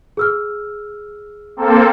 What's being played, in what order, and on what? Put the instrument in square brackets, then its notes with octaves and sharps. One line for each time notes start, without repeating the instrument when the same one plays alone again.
[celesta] G#4 E6 F6
[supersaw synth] A#3 C4 A4